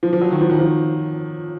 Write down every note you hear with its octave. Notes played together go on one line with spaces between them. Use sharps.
F3
F3
F#3
D#3
F3
D#3
F3